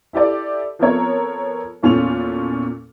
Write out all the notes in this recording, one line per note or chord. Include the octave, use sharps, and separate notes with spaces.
E4 G4 A4 D5
F3 B3 C4 A4 A#4 C#5
E2 A#2 C#4 F4 A4 F7